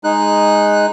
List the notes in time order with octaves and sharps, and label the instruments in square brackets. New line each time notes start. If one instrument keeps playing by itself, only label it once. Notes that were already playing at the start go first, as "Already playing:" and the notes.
[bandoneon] G#3 D#4 F#6